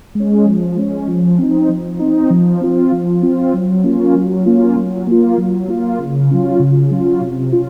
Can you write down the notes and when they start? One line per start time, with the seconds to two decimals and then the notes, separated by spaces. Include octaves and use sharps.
0.15 G#3 C#4
0.46 F3
0.77 G#3 C#4
1.08 F3
1.39 C4 D#4
1.69 F3
1.99 C4 D#4
2.30 F3
2.61 C4 F4
2.92 F3
3.23 C4 F4
3.53 F#3
3.84 A#3 C#4 F4
4.15 F#3
4.45 A#3 C#4 F4
4.76 F#3
5.07 A#3 F4
5.38 F#3
5.68 A#3 F4
5.99 C#3
6.30 F#3 C#4 F4
6.60 C#3
6.91 F#3 C#4 F4
7.22 C3
7.53 C#4 F4